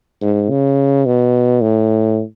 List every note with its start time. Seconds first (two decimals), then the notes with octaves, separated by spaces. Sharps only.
0.22 G#2
0.50 C#3
1.06 B2
1.62 A2